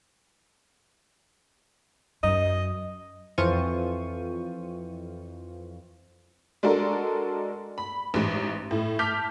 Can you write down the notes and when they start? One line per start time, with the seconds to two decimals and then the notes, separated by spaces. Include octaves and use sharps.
2.23 F#2 D#5
3.38 F2 E3 F4 C5 C#6 D#7
6.63 G#3 D4 F#4 A4 A#4
7.78 B5
8.14 A1 G#2
8.71 A2
8.99 A5 D6 F6 G6 B6